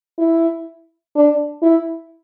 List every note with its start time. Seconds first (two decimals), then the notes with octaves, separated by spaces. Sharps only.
0.18 E4
1.16 D4
1.62 E4